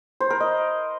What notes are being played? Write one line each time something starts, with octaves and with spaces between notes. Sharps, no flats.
C5
A#4
D#5